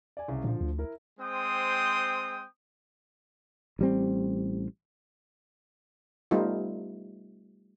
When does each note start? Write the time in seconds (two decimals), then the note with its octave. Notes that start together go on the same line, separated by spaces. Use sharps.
0.17 D5 G#5
0.28 C2 C#3
0.44 A#2 D3 F3
0.61 D2
0.78 E4 A#4
1.20 G#3 C4 C5 G5 D#6
3.79 A1 G3 C4
6.31 G3 A3 B3 D#4 F4